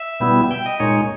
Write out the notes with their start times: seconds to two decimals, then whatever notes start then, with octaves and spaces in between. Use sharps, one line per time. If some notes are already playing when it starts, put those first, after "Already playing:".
Already playing: E5
0.20 B2 G3 B3 E4
0.51 G5
0.66 D#5
0.80 A#2 G#3 D#4 C#5